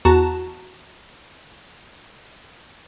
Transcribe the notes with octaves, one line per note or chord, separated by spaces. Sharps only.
E2 F#4 A5 A#5 E7